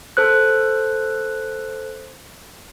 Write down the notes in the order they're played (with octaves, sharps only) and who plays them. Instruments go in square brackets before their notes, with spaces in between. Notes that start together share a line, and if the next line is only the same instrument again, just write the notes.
[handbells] A4 C5 F#6